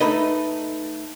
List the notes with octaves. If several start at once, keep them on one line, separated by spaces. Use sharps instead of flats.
A3 D#4 B4 D#5